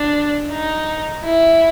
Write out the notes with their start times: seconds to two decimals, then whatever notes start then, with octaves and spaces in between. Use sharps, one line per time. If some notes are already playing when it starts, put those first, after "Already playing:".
Already playing: D4
0.50 D#4
1.24 E4